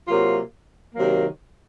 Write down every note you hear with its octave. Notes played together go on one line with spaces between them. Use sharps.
C3 F#3 A#3 F4
C3 D#3 F#3 A#3